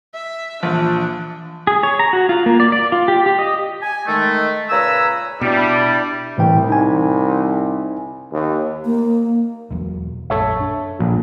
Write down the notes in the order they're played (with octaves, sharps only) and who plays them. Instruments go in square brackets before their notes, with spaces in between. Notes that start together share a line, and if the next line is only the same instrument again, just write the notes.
[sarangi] E5
[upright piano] A#1 [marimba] E3 [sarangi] D4
[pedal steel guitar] G#4
C#5
A#5
F#4
F4
A#3
D5
D5
F4
G4
G4
D#5
[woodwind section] G#5
D#3 G#3 A3
A#2 C#3 B4 G#5 A#5 E6
[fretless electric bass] B2 [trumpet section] G3 [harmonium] D4 E4
[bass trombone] C2 [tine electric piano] A2 E3 G5
[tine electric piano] D#4 G#5
[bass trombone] D#2
[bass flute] A#3
[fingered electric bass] E1 E2 F#3
[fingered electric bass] A#1 F#2 [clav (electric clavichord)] A4 C#5 E5
[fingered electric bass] D4
[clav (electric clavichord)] A#1